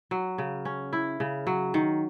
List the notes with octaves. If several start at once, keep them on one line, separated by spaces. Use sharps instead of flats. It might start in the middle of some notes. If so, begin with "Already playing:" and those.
F#3
C#3
C#4
E4
C#3
F#3
D#3